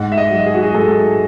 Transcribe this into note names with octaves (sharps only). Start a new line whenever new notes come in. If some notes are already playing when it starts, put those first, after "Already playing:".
Already playing: G#2 F#5
E5
D#5
F#3
G#4
F#4
G#4
G#2 A4